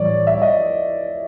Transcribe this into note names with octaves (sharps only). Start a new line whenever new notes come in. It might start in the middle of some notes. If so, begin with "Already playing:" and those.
Already playing: A2 E3 G3 C#5 D5
E5
D#5